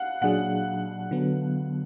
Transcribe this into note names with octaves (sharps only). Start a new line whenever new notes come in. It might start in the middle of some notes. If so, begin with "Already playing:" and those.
Already playing: F5 F#5
A#2 F#3 D4 G#4 F#5
D3 F#3 B3